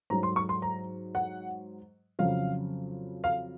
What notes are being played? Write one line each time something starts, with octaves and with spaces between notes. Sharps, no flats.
G#2 F#3 A#5
C6
C#6
C6
A#5
F#5
F2 C#3 F#3 F5
F5